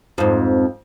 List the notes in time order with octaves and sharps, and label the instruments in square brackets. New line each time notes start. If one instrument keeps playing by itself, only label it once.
[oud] F2 G#2